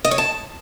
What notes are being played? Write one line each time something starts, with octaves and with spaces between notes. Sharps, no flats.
D#5
C#5
A5